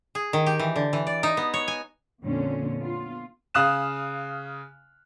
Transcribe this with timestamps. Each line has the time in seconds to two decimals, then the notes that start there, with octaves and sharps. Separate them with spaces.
0.15 G#4
0.33 D#3
0.46 G4
0.59 E3
0.76 D3
0.93 E3
1.07 D5
1.23 D#4
1.37 B3
1.54 C#5
1.68 G#5
2.23 F2 A#2 D3 C#4
2.78 B3 F4
3.54 C#3 F5 D#6 F6 F#6 E7